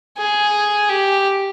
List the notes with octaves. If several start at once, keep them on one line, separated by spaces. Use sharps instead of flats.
G#4
G4